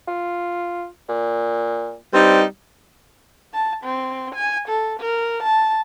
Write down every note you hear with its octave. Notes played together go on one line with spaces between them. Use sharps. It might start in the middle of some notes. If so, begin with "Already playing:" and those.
F4
A#2
G2 G3 C4 D#4
A5
C4
G#5
A4
A#4
A5